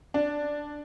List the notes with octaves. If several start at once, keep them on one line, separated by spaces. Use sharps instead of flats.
D4